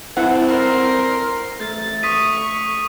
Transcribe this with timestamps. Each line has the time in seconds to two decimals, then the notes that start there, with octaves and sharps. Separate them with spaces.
0.17 C4 E4 A4 F#5
0.48 A#4 C6
1.60 A3 A6
2.03 C#6 D#6 B6 D#7